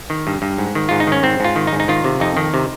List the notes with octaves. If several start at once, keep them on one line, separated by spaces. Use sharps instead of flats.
D#3
G2
G2
G#2
D#3
G#2 F4
D#4
D#3 C#4
G#2 C4
G#2 F4
D#3
D#4
G#2
D#4
D#3 F4
C3
F2 D#4
D#3
C3